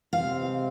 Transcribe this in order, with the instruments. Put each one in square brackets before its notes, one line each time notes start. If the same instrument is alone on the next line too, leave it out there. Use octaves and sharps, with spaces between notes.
[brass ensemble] C3 G#3 C4 [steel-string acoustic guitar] F5